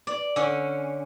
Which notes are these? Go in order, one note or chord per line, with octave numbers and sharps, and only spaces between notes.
D5
D3 C#4